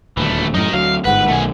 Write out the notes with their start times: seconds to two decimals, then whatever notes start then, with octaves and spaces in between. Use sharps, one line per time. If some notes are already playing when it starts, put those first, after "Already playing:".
0.17 D#1 D2 E3 A3
0.54 F#2 A2 D#4 A#4
0.73 D2 F#3 F5
1.05 G1 G#2 B4 F#5
1.28 B1 D#3 A3 G#5